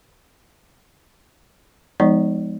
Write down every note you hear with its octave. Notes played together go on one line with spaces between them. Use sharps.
F3 G#3 B3 D#4 D5